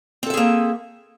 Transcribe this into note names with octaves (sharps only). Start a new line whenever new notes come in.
A#3 C4 G#4 A4 E5